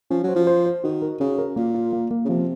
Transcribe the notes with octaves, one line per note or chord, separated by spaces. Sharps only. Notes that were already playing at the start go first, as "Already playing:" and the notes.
F3 C#4
F#3
C5
F3
C5
C5
D#3 F#4
A#4
C#3 F#4
A#4
A#2 A#3
F4
A#3
A#3
C#3
C3 F3